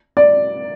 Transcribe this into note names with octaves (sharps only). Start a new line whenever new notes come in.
D5